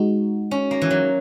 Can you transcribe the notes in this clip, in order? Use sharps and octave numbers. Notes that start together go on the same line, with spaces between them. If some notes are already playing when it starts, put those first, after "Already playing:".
Already playing: G#3 D#4 F#4
C#4
A#3
E3
F#3